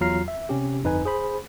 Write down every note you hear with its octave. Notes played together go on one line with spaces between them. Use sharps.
E2 F#3 F4 A#5 F6 C7
E5
C3 C#4 G4
G1 F2 D#4 B4 G#5
G#4 C5 B5